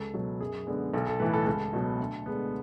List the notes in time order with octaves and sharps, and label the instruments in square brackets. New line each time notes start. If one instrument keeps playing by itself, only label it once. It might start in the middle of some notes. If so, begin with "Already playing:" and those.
Already playing: [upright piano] C#2 A4
B2 F#3
F#2 G#4
D3 G#3 B3
B1 A4
A4
A2 E3 A3 B4
A4
C#2 A4
B2 F#3
D2
D3 G#3 B3